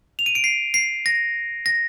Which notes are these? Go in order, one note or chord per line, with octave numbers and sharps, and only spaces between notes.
F7
D#7
D7
C7
C7
A#6
A#6